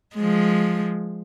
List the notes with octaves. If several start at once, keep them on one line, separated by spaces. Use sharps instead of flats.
F3 G#3